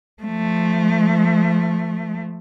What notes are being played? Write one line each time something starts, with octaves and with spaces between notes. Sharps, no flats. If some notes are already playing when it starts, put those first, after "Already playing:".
F3 A3